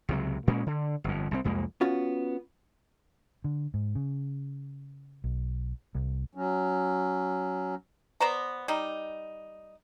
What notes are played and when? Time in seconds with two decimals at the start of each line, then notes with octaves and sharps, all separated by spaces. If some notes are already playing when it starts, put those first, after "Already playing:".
0.09 C#2 C3 F#3
0.47 A#2 G#3 A#3 C#4
0.66 D3
1.04 G1 F2
1.31 C2 C3 C4
1.44 C2 F2 G#3 A#3
1.81 B3 C#4 F4 F#4
3.44 D3
3.74 G#2
3.95 C#3
5.24 B1
5.95 C2
6.35 F#3 C#4
8.20 B3 C5 D5 A#5
8.68 G3 D#4